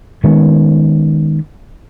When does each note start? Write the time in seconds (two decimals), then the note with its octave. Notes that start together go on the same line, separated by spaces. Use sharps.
0.24 D#3 G#3 B3 C#4